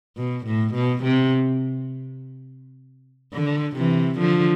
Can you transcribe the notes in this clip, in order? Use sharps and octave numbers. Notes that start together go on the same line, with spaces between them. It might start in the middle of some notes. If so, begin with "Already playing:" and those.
B2
A2
B2
C3
D3
C3 E3
D3 F3